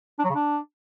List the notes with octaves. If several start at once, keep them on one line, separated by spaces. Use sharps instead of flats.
D4
F#3
C#3
D4